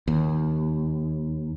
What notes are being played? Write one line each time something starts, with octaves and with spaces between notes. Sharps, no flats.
D#2